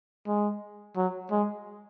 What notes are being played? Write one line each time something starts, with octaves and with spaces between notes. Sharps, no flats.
G#3
F#3
G#3